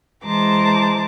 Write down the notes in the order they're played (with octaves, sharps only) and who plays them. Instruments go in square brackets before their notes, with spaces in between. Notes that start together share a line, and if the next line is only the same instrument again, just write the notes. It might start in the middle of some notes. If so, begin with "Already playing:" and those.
[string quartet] E3 G#3 C5 A5 A#5 D6